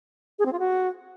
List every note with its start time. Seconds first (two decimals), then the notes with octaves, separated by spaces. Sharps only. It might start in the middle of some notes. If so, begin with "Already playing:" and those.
0.39 G#4
0.46 C4
0.52 F4
0.59 F#4